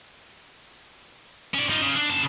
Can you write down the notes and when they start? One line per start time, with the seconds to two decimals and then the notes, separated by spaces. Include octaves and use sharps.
1.54 C#4 D5
1.70 D#4 F4
1.82 C#3
1.96 D4
2.09 C#3 A5